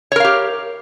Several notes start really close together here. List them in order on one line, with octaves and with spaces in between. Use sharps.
C#5 A#4 F5 G4